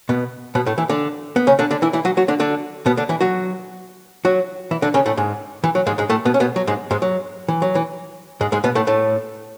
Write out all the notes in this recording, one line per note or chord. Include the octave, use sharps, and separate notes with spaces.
B2 B3
B2 B3
A2 A3
E3 E4
D3 D4
B3
C#3 C#4
D3 D4
D3 D4
E3 E4
E3 E4
F#3 F#4
F#3 F#4
D3 D4
D3 D4
B2 B3
D3 D4
E3 E4
F#3 F#4
F#3 F#4
E3 E4
D3 D4
C#3 C#4
A2 A3
G#2 G#3
E3
F#3
G#2 G#3
G#2 G#3
A2 A3
B2 B3
C#4
B2 B3
F#3
G#2 G#3
G#2 G#3
F#3
E3
F#3
E3
G#2 G#3
G#2 G#3
B2 B3
A2 A3
A2 A3